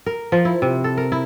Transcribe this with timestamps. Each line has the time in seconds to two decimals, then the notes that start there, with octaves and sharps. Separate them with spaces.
0.06 A#4
0.32 F3
0.45 E4
0.62 C3
0.84 A4
0.97 A#4
1.12 E4